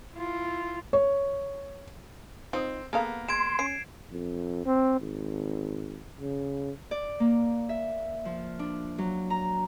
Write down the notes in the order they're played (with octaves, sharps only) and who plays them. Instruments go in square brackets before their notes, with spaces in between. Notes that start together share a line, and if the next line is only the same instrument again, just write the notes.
[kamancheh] E4 F4
[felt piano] C#5
[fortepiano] C4 [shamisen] D#4 F4 D#5
[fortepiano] A#3 B3 [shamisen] G#4 A4 F5
[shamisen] G#3 [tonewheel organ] C6 [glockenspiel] G#6 D7 E7
[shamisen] C#4 [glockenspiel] C7 D7
[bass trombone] F2
C4
G#1
C#3
[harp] D5
A#3
E5
F3
D4
F#3
A#5